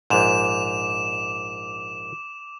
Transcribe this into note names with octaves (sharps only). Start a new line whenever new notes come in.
A#1 G#2 D6 E7 F7